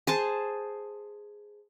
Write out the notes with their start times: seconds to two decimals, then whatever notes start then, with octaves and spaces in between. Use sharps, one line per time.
0.07 G#4 C5 A5